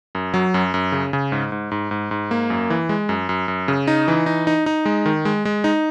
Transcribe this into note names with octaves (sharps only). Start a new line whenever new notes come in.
F#2
F#3
F#2
F#2
C#3
C#3
G#2
G#2
G#2
G#2
G#2
A#3
F#2
E3
G#3
F#2
F#2
F#2
C#3
D#4
E3
D#4
D#4
D#4
G#3
D#3
G#3
G#3
D#4